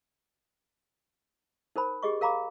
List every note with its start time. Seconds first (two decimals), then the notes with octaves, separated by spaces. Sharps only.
1.76 D#4 A#4 C5 B5
2.03 G4 G#4 D#5 C#6
2.21 A#4 F5 A#5 B5 D6